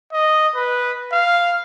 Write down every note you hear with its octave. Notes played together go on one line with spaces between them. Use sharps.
D#5
B4
F5